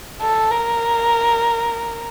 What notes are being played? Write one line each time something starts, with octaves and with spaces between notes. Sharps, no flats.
A4
A#4